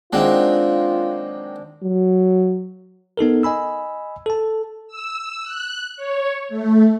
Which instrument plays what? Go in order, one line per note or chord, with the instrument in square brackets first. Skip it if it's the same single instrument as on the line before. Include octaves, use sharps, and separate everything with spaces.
[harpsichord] D#3 F#3 A#3 [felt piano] G#3 C4 [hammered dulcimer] D4 [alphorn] F4
[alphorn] F#3
[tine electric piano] B3 D#4 A4 A#4
D#5 G#5 B5 E6
A4 A5
[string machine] E6
F#6
C#5
A3